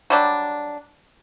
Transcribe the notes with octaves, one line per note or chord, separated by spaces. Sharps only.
F#3 G3 D4